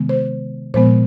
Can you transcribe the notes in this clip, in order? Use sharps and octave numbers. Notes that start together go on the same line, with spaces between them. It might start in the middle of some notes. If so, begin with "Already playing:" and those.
Already playing: C3 D#3 G#3 B3
C5
A#2 F3 G#3 B3 C5